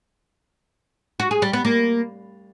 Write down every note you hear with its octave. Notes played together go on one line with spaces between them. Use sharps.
F#4
G#4
G3
B3
A#3